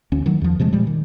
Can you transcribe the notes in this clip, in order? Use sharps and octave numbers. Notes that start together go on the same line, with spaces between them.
D2 C#4
D#3 F#3
E2 F3
C3 F3 G#3 A3
A#2 F3 G3 G#3
D#3